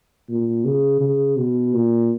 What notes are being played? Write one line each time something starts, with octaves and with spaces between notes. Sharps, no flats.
A#2
C#3
C#3
B2
A#2